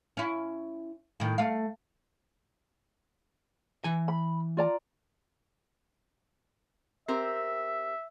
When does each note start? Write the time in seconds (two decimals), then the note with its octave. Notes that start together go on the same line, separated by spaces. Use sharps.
0.17 C#4 E4
1.20 A2 D#3
1.38 A3 F5
3.84 E3 G#5
4.08 B5
4.57 F4 D5 A#5
7.08 C4 G4 A#4 E5